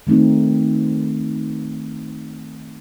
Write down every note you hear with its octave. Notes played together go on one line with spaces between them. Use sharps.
D#3 A3 C4 D#4